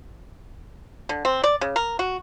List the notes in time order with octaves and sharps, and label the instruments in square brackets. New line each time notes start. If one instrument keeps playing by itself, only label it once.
[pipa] D3
C4
D5
C#3
A#4
F#4